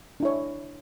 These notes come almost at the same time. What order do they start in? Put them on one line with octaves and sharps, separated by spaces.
D4 E4 C#5